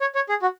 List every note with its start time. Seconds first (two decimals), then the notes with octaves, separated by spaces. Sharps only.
0.01 C#5
0.15 C#5
0.29 G#4
0.42 F#4